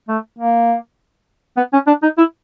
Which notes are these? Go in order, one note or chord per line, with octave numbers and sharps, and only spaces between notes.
A3
A#3
B3
C#4
D4
D#4
E4